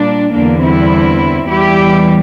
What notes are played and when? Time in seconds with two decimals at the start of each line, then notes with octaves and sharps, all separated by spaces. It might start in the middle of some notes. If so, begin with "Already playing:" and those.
Already playing: A#2 G3 A#3 D4
0.33 E2 D3 G3 A#3 D4
0.62 C4 E4
1.49 E2 E3 G3 E4 G4